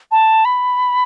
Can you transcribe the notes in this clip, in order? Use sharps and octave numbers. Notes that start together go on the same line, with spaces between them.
A5
B5